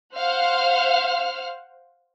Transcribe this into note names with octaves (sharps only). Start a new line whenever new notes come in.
C5 F5 F#5 F6